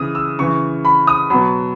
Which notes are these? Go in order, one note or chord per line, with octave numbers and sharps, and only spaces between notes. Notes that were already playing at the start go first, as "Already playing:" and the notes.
Already playing: C#3 E3 D#6
E6
C#3 E3 C#6
B5
D#6
B2 F#3 B5